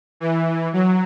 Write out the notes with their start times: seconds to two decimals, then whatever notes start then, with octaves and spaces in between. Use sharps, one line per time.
0.20 E3
0.73 F#3